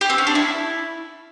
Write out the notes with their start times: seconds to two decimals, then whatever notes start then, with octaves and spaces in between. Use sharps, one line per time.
0.01 G4
0.10 C4
0.18 C#4
0.27 D4
0.35 E4